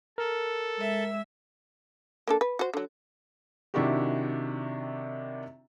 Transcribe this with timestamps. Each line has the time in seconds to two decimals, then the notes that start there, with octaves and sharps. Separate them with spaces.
0.18 A4 A#4
0.77 G#3 E5 E6
2.28 A#3 D4 A4
2.41 B4
2.59 F#4 C5
2.74 D3 F#3
3.74 C3 D#3 D4 E4 F#4 G4